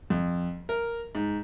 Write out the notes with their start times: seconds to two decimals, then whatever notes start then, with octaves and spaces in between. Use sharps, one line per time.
0.10 F2
0.69 A#4
1.15 G#2